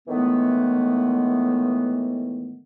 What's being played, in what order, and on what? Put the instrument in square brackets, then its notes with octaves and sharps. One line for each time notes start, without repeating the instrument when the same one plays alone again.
[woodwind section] A2 D#3 E3 G#3 A3 B3